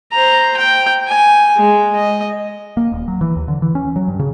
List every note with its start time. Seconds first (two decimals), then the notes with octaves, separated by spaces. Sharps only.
0.12 C5 A#5
0.57 G5
1.08 G#5
1.57 G#3
1.96 D#5
2.77 A#3
2.92 D#1
3.08 F#3
3.21 E3
3.36 D#2
3.48 D3
3.62 E3
3.75 C#4
3.96 F#3
4.08 G2
4.19 C#3